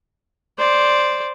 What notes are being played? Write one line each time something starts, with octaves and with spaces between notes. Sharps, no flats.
C5 D5